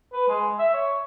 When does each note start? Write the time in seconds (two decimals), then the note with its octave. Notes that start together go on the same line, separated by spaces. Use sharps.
0.13 B4
0.28 G#3
0.59 E5
0.74 C#5